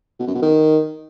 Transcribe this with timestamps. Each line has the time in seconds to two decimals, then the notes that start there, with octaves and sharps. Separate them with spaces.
0.20 B2
0.27 F#2
0.35 B2
0.42 D#3